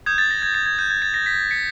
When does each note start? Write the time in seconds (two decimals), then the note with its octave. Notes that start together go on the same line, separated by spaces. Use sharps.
0.06 D#6 G6 G#6
0.18 A6
0.31 A#6
0.42 G#6
0.54 A6
0.66 G#6
0.79 G6
0.90 G#6
1.02 A6
1.14 A#6
1.26 B6
1.51 B6 C#7